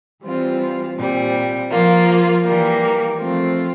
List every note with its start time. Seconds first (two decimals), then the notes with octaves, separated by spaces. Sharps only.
0.23 E3 G3 C4 F4
0.97 A#2 G3 C4
1.71 F3 A#3 F4
2.44 E3 G3 A#3
3.18 F3 A3 C4 F4